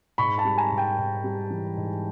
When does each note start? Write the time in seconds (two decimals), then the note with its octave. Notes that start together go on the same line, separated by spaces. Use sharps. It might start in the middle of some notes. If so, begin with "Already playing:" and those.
0.18 G#2 B5 C#6
0.38 A5 B5
0.45 G3
0.57 G#5 A#5
0.71 G#2
0.77 G5 A5
0.98 G#2
1.24 G3
1.50 E3
1.77 G#2